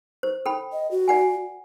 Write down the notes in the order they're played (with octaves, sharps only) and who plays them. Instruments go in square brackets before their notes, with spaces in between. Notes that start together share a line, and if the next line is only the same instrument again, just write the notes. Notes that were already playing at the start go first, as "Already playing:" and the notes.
[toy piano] C5
A4 G5 B5
[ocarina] D#5
F#4
[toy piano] D5 F#5 G#5